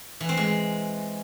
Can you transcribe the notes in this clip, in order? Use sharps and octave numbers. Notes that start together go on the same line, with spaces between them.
E3
C4
G#3